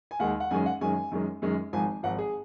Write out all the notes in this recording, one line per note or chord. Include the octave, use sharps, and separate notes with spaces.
G#5
D#2 D#3 G#3 F#5
F#5
F#2 D#3 G#3 C#4 G#5
F#5
F#2 D#3 G#3 C#4 G#5
F#2 D#3 G#3 C#4
F#2 D#3 G#3 C#4
G#1 G#2 F3 G#5
G#1 G#2 F3 F#5
G#4